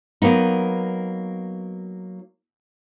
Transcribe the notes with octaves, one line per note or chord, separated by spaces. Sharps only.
F#3 A#3 B3 D#4